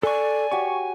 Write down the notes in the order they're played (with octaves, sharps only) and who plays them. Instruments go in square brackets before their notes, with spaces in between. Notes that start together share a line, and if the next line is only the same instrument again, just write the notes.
[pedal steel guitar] A4 C#6 [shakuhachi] D5 [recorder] G#5
[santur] F#4 G4 C#5 [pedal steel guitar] C#6